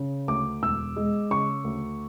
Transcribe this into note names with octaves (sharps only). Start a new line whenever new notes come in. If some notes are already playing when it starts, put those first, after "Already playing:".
Already playing: C#3
D2 D6
E1 E6
G#3
C#3 C#6
D2